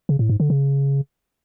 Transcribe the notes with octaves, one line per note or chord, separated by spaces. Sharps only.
C#3
A2
G#2
D3
C#3